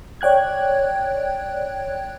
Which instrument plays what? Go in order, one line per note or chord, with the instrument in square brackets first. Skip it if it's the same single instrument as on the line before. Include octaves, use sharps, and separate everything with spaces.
[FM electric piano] C#5 D5 G5 F#6 G#6